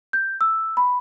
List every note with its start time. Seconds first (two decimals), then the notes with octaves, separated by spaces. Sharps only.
0.13 G6
0.41 E6
0.77 B5